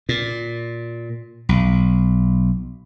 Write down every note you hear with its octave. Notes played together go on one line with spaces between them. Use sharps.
A#2
B1